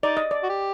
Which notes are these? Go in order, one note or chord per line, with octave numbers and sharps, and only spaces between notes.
D#4 D5
D#5
D5
F#4
G4